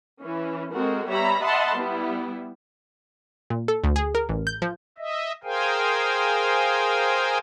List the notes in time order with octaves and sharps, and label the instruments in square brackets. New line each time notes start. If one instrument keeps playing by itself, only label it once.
[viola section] E3 C#4
G#3 C4 F#4 A4 A#4
G3 B3 C#5 E5 A#5 B5
D#5 E5 F#5 A5 B5 C6
G3 B3 E4
[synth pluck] A#2
A4
D2
G#4
A#4
A1
G6
F3
[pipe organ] D#5 E5
G#4 A#4 C5 F5 G5 G#5